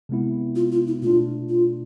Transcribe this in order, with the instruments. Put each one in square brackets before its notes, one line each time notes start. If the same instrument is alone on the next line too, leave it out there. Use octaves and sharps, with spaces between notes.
[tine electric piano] C3 G#3 B3 E4
[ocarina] F4
F4
E4
[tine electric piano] B2 A3 D4 [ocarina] F4
[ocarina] F4